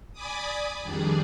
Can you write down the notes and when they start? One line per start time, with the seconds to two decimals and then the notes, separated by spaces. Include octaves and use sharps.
0.13 D5 G#5 B5 D6 D#6
0.82 F2 D#3 G3 D4 G#4 D5